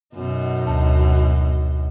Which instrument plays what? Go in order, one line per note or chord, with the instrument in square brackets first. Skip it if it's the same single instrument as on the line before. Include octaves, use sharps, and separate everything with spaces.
[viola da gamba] F#2 B2 D#4
[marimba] D2 A5